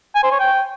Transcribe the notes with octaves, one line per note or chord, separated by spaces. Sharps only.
G#5
C5
C#5
G5